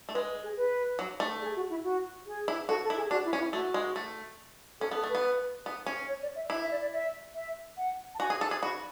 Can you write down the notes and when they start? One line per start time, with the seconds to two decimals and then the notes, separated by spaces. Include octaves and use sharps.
0.09 A3
0.14 G#3 B4
0.43 G#4
0.57 B4
0.99 F#3
1.20 A3
1.42 G#4
1.56 F#4
1.70 E4
1.84 F#4
2.27 G#4
2.48 E4
2.69 F#4 A4
2.84 A4
2.90 E4
2.97 G#4
3.11 D4 F#4
3.25 E4
3.33 C#4
3.39 E4
3.53 A3 F#4
3.74 G#3
3.96 A3
4.80 C#4 A4
4.91 B3 A4
5.03 A3
5.09 B4
5.15 B3
5.66 B3
5.86 C#4
6.08 C#5
6.22 D5
6.36 E5
6.50 E4 E5
6.61 E5
6.71 D5
6.81 D5
6.93 E5
7.35 E5
7.77 F#5
8.15 A5
8.20 F#4 G#5
8.30 G#4
8.41 A4
8.51 G#4
8.62 F#4 B5